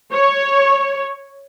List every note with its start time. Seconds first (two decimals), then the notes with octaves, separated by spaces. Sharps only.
0.12 C#5